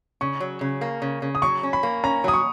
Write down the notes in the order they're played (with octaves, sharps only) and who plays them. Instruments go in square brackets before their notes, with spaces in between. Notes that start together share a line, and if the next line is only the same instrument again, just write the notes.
[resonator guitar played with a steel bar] C#3 [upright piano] C#6
[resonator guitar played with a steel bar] F#3
C#3
A#3
C#3
C#3
[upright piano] D#6
[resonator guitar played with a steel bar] F#3 [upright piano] C#6
[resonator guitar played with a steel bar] C#4
[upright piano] B5
[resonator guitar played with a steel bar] A#3
[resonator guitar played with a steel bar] C#4 [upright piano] A#5
[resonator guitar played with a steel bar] F#3 [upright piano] D#6
[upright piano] C#6